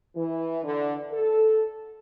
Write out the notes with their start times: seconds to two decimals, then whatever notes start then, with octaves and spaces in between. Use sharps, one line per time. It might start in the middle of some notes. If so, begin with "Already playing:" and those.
0.16 E3
0.64 D3
1.12 A4